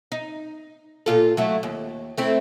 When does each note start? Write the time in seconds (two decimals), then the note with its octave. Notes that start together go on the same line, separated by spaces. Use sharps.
0.12 D#4
1.06 A#2 F4 A4
1.37 F#3 A3 E4
1.63 D#2
2.18 A3 C4 E4